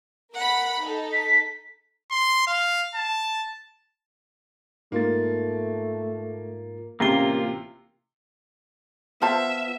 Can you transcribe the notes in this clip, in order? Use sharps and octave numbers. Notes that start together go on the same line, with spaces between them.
A#4 F#5 B5
D#4 A4
B6
C6
F5
A5
G#2 A3 A#3 F4 A6
A1 C3 A#3 C#4 F4 G7
B3 F4 C5 E5 A5